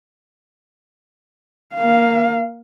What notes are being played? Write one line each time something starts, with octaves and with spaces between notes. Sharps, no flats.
A#3 F5